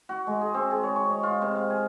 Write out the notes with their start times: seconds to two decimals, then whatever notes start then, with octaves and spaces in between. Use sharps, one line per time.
0.09 F#4
0.27 G#3
0.41 G#4
0.54 C4
0.71 G#4
0.83 C#5
0.96 C#6
1.10 D#5
1.23 F4
1.42 C3
1.55 F5
1.70 G#5